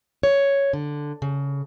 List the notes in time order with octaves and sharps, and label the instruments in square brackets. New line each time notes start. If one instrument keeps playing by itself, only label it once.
[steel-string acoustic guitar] C#5
D3
C#3